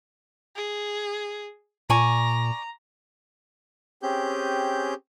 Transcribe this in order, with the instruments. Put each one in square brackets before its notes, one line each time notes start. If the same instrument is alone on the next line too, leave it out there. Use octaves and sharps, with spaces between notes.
[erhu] G#4
[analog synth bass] A#2 [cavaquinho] D5 G#5 C#6 [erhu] A#5
[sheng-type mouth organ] C4 C#4 G4 G#4 G6